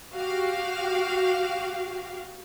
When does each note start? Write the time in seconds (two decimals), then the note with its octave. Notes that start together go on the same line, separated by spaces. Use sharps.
0.15 F#4 G4 F5